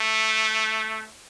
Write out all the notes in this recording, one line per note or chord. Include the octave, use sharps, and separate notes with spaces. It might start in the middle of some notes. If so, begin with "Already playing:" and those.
Already playing: A3